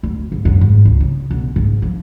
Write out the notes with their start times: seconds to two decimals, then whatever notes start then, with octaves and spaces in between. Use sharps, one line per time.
0.03 D2
0.32 G#2
0.45 F#2
0.61 G#2
0.85 C#2
1.00 C#3
1.31 B1
1.56 G#2
1.82 F3